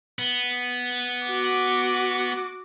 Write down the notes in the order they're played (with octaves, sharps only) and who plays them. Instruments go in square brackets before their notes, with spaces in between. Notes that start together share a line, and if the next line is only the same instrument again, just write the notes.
[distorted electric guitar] B3
[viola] F#4 D6